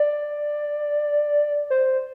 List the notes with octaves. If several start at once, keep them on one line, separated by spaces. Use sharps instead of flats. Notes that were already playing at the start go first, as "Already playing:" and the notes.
Already playing: D5
C5